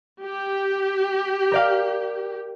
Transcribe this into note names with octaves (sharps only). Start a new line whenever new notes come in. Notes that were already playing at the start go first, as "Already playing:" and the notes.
G4
A#4 D5 F5